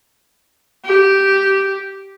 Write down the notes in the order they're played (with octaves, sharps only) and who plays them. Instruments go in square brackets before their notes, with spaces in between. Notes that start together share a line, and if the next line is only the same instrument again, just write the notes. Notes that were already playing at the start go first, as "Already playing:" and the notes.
[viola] G4